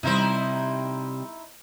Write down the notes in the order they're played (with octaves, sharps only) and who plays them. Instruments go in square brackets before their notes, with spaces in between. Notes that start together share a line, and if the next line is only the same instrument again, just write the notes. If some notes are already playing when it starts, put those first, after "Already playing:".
[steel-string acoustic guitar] C3 G3 [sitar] D#4 E4 C5